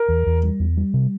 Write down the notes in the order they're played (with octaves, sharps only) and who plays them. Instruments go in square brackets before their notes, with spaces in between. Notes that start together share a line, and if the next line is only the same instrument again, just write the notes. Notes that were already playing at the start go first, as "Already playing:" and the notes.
Already playing: [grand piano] A#4
[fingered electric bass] E2
E2
G3
E2
G3
C3